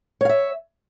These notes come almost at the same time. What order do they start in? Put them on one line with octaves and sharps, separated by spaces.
C#5 F5 E5